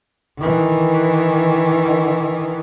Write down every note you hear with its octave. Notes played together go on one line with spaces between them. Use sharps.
D#3 E3